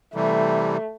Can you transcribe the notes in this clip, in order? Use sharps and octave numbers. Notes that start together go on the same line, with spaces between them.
C3 E3 G3 A3